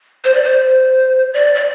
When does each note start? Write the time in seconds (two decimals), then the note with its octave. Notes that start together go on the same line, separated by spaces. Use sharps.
0.24 C5
0.35 D5
0.44 C5
1.34 D5
1.55 D5